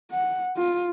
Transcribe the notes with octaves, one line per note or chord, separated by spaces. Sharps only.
F#5
F4